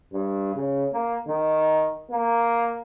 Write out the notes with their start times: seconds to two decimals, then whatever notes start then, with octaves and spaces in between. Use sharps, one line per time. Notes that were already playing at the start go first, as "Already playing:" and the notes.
0.13 G2
0.55 C#3
0.93 A#3
1.28 D#3
2.11 A#3